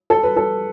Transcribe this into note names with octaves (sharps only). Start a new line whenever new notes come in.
A4
B4
A4